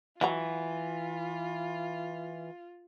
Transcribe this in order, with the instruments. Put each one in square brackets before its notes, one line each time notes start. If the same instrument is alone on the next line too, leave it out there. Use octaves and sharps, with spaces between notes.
[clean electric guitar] E3 [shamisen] F#3 F#4 A#5 [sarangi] F4